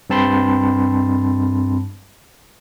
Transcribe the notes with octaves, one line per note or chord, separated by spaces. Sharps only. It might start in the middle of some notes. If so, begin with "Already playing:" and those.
G2 C4 A5 B5 C6